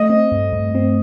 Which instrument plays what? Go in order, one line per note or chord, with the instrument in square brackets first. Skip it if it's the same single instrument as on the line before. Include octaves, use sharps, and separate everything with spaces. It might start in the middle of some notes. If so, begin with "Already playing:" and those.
Already playing: [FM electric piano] A3 [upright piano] D#5
[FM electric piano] C4
G2
G2
C4